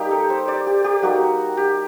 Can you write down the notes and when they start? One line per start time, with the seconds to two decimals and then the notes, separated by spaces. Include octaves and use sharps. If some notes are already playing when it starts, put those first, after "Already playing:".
Already playing: G3 A#3 D#4 G4
0.11 A4
0.30 C5
0.48 D5
0.67 G4
0.84 G4
1.02 G3 A#3 D#4 F#4
1.57 G4